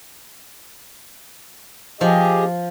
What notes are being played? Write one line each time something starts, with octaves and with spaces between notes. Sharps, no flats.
F3 G4 G#4 D#5